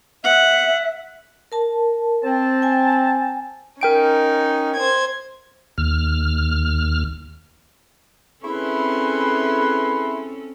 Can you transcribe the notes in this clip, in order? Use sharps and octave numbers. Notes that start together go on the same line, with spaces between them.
E5 F#5
A#4 A5
C4 A5
G5 G#5
C#4 D#4 A#4 G5 D7
C5 G#6
D#2 F6
C4 C#4 E4 G#4 A4 B4 E5 C6